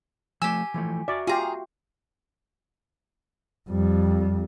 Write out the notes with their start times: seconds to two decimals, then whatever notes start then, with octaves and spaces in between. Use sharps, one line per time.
0.42 F3 A3 G4 G#5 E6
0.74 E3 F3 A3
1.08 F#4 D5 E5
1.27 F4 G4 G#4 A#5
3.69 F2 G3